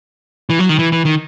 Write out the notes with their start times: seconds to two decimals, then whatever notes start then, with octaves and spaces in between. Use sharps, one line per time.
0.50 E3
0.59 F#3
0.69 D#3
0.79 E3
0.92 E3
1.05 D#3